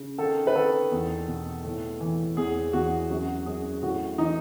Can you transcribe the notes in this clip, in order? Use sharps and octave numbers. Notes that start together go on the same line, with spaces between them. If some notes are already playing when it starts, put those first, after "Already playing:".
Already playing: C#3
D#3 A4
B4
D#3 A4
E2
B2
A2
E3
E2 G#4
E2 F#4
F#2 F#4
F#2 G#4
A2 F#4
E3 D#4